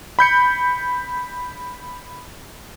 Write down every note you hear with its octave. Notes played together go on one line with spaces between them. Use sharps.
B5 G6 C#7